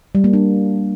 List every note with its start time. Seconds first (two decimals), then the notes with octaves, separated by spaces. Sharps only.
0.15 G3
0.24 A#3
0.34 D4